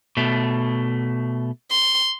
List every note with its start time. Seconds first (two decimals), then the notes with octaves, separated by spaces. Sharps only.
0.17 B2 A3
1.71 C6